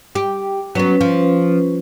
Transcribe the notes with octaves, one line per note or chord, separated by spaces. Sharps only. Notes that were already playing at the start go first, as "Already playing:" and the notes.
G4
F#3 B3 C#4 B4
F3